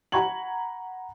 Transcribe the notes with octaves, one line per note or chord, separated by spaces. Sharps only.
F#5 A#5 B5 C#6 G#6 F#7